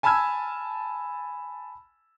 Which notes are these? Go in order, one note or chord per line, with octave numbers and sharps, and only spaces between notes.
G#5 A5 B5 E6 F6 G#6